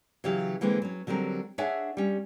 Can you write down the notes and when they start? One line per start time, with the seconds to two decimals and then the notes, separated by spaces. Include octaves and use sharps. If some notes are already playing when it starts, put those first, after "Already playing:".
0.24 C#3 E3 F#3 G4 F5
0.61 D3 E3 G#3 A#3 C4
0.82 F#3 C#4
1.07 D3 F#3 G3 C4 A#4
1.58 D4 G#4 C#5 E5 F#5 G#5
1.97 G3 C#4